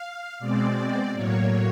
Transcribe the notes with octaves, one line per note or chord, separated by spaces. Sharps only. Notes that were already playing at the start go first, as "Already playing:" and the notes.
Already playing: F5
B2 G#3 C4 D5
A2 F#3 A#3 C#5